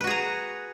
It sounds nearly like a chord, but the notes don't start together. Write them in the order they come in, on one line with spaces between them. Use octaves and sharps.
B4 F#4 G#4 A#5